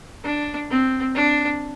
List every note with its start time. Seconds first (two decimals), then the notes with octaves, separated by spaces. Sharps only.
0.24 D4
0.70 C4
1.15 D4